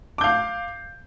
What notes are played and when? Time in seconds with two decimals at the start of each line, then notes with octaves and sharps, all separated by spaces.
0.18 D6
0.21 G6
0.24 F5